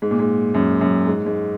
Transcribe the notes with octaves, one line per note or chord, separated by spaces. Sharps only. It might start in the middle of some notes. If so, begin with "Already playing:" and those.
G#2
A#2
G#2
F#2
F#2
G#2
G#2